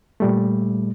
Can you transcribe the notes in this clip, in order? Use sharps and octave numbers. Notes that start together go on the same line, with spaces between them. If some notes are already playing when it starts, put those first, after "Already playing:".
A#2 G3 A3